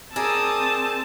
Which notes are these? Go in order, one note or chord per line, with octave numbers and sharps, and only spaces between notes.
C4 G#4 A#4 D5 A5 D#6 E6